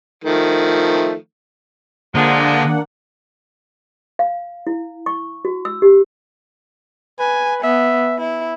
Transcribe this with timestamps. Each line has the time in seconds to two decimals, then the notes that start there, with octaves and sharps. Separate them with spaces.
0.24 D#3 F3 A3
2.15 A#2 D3 F3 G#3 A#3 D4 F#5
4.19 F5
4.67 E4
5.06 C#6
5.45 F#4
5.65 E6
5.82 G4
7.19 B4 G#5
7.63 B3 E5
8.18 E4